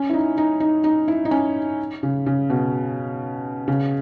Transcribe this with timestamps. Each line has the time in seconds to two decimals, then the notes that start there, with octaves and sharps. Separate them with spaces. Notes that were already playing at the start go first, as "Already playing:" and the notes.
Already playing: C#4
0.09 E4
0.13 D#4
0.38 D#4
0.60 D#4
0.84 D#4
1.08 E4
1.25 D#4
1.31 C#4
2.03 C#3
2.26 C#3
2.50 B2
3.68 C#3